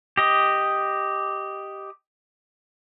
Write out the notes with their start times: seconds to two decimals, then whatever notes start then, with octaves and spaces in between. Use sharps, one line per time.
0.17 G4 D#5